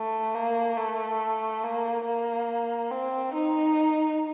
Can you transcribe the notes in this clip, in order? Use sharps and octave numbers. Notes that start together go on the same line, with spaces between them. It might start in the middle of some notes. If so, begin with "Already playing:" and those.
Already playing: A3
A#3
A3
A#3
A#3
C4
D#4